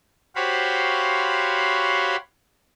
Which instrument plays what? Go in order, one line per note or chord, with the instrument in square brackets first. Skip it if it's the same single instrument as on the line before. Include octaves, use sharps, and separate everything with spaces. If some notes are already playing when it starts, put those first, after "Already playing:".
[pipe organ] F#4 G4 C5 C#5 F5 B5